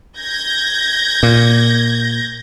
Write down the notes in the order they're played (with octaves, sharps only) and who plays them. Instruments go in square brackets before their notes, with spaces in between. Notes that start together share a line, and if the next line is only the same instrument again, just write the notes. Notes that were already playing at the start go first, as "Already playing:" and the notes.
[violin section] G6 G#6 A#6
[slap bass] A#2